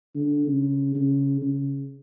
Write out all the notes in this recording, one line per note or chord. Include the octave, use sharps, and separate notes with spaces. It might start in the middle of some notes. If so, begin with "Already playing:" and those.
D3
C#3
C#3
C#3